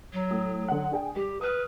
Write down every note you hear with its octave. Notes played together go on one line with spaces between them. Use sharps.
F#3
A2 D#6
D3 F#5
D4 G#4 G5
G3 G4
B4 D#6 F6